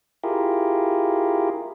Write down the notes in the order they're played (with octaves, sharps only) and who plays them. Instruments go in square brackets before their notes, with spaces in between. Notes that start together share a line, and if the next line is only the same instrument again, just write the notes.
[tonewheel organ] E4 F4 G4 G#4 A#4